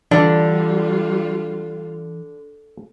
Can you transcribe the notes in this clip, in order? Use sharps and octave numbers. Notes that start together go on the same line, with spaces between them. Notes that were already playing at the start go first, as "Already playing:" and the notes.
D3 E3 G3 D4 F4